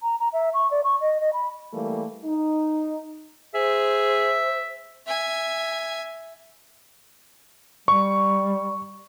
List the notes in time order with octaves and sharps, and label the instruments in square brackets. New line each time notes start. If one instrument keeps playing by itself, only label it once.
[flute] A#5
A#5
E5
C#6
D5
C#6
D#5
D#5
B5
[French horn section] E3 G3 A3 A#3
D#4
[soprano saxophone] G#4 [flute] C5 [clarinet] E5
[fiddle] E5 G#5
[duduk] G3 [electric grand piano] C#6